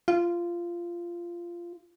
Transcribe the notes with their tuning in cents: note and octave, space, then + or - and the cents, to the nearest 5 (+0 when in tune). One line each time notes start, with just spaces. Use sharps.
F4 -15